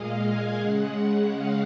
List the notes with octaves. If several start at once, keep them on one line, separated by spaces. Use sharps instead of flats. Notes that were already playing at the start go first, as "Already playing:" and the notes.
Already playing: A#2 G#3 D#5 F5
G#5
C#3 G#3 F#5
F5